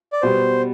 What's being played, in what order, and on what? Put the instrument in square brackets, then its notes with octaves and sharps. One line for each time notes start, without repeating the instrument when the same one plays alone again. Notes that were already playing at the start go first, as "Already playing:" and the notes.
[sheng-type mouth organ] D5
[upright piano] B2 G3 B3 [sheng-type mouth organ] C5